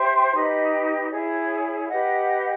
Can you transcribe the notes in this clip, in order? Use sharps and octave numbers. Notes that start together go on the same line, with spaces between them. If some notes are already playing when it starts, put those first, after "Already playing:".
Already playing: G4 C5 E5 G5
D#4 G4 B4 D#5
E4 G#4 C#5
G4 B4 D#5 F#5